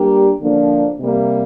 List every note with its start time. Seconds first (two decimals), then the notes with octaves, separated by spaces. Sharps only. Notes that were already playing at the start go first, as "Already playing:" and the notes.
Already playing: G3 A#3 D4 G4
0.40 D3 F3 A#3 D4
1.00 C3 G3 A#3